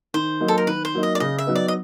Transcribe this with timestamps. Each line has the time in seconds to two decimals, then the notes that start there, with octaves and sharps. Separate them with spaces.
0.14 D#3 C5
0.40 F#3 A#3 D#4
0.48 A4
0.58 A#4
0.67 D#3 B4
0.85 C5
0.94 F#3 A#3 D#4
1.03 D#5
1.15 D5
1.20 C#3 D#5
1.38 E5
1.47 F#3 B3 D#4
1.55 D5
1.68 D#5